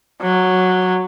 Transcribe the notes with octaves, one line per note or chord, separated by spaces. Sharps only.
F#3